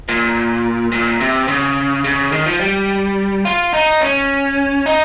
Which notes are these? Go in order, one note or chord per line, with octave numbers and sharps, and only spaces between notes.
A#2
A#2
C3
C#3
C#3
D#3
F3
G3
F4
D#4
C#4
D#4